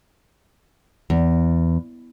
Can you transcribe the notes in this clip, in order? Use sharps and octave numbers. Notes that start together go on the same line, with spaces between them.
E2